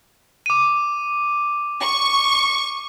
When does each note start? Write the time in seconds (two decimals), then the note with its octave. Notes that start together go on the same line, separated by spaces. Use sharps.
0.46 D6 D#7
1.82 C#6